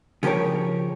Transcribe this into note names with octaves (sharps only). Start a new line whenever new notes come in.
C#3 F3 G4 A#4 C#5